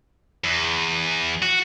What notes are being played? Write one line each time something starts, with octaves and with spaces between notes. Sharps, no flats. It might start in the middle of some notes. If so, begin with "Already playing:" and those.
E2
F#4